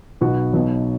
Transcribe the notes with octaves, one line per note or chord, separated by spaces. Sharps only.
B1 B2 B3 F#4
B1 B2 F#3